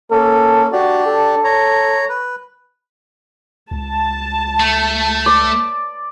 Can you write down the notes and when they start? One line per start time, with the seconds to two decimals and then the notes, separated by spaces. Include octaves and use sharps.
0.11 A#3 C#4 A4
0.72 D4 F#4 G4 D5
1.06 A4
1.44 C#5 A#5
2.09 B4
3.71 C#2 A5
4.60 A3
5.26 D5